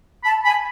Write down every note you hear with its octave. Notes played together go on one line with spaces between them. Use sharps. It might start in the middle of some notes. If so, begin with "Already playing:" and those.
A5 B5
G#5 B5